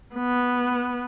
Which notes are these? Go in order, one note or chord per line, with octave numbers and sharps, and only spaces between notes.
B3